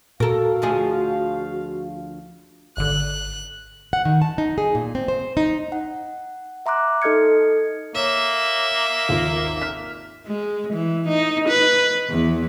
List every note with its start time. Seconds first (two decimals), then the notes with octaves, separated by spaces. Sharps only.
0.20 A#2 F#4 A4 A#4 F5
0.62 D2 F3 G#4
2.77 G#1 D3 F#6
3.93 F#5
4.05 D#3
4.22 A5
4.38 D#4
4.58 G#4
4.75 A#2
4.95 C4
5.08 C5
5.37 D#4
5.72 F#5
6.66 E5 A#5 C6 D6 F#6
7.02 D#4 A4 D#5 F6 G#6 C#7
7.95 A#3 C#5 E5
9.09 G#1 D#2 F4
9.62 F6 B6
10.27 G#3
10.73 E3
11.08 D#4
11.49 B4
12.10 E2